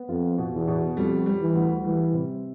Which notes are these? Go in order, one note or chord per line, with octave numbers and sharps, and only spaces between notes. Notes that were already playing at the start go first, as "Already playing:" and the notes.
Already playing: B3
F2 F4
B2
E2
B2
F2 G3
G3
E3
D2
E3 G3
C3